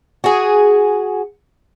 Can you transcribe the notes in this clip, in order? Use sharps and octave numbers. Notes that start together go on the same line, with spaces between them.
F#4 G#4